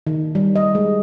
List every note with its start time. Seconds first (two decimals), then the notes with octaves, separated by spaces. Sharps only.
0.07 D#3
0.35 G3
0.56 D#5
0.75 G#3